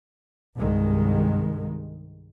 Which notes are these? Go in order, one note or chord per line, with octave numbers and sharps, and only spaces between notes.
C2 G2 D#3 G#3